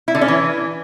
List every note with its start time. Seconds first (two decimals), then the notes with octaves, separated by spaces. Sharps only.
0.08 E4
0.15 D3
0.21 C#4
0.28 E3